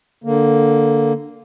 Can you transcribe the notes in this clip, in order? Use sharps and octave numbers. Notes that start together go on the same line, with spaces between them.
D3 A#3